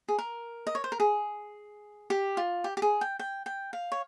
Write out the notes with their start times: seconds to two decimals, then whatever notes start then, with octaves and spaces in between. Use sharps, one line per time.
0.09 G#4
0.18 A#4
0.67 D#5
0.75 C#5
0.84 C5
0.92 A#4
1.00 G#4
2.10 G4
2.37 F4
2.64 G4
2.77 G4
2.82 G#4
3.01 G5
3.19 G5
3.46 G5
3.73 F5
3.92 C#5